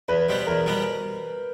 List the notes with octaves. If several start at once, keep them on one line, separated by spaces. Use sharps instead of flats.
E2 B4
B2 G3 B3 C5
E2 A#4
B2 G3 B3